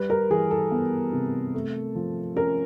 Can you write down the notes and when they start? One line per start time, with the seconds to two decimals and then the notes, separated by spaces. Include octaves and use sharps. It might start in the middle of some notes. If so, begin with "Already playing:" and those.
Already playing: G3 B4
0.10 A#4
0.30 E3 G#4
0.51 A4
0.71 B3
1.13 C3
1.54 A3
1.95 F3
2.36 C#4 A#4